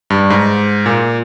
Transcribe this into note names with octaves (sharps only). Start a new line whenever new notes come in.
G2
G#2
A#2